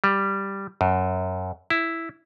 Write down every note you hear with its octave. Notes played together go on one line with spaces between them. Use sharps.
G3
F#2
E4